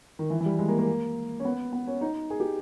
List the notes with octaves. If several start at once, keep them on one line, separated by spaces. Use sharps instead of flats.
D#3
E3
E3
G3
G#3
A#3
A#3
C#4
B3
B3
C#4
D#4
G#4
G4